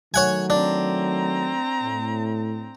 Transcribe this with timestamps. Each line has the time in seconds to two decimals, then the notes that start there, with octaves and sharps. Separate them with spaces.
0.14 D#3 F#3 A3 C#5 F#5 G#5
0.50 C4 D4 A#5
1.81 A2